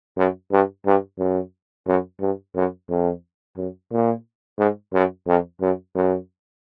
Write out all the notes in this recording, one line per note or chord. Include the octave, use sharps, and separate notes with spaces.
F#2
G2
G2
F#2
F#2
G2
F#2
F2
F#2
A#2
G#2
F#2
F2
F#2
F#2